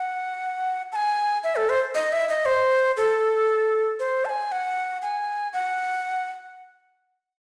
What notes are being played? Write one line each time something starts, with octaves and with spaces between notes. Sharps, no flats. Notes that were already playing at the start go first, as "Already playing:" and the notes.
Already playing: F#5
A5
G#5
E5
A4
C5
D#5
E5
D#5
C5
A4
C5
A5
G#5
F#5
G#5
F#5